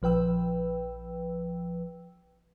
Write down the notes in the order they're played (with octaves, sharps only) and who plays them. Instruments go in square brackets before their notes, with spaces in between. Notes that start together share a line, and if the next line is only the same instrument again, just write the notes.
[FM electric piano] A#1 F3 B4 G5 E6